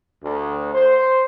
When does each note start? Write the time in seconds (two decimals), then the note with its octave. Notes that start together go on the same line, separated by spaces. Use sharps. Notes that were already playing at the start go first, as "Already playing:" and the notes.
0.23 D2
0.74 C5